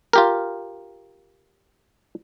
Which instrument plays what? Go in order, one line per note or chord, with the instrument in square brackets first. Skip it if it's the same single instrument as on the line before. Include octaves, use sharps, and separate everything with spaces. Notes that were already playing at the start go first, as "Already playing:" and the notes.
[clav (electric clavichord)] F4 G4 A#4